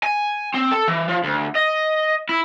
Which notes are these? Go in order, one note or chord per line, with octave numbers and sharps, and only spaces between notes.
G#5
C4
A4
E3
F3
D2
D#5
E4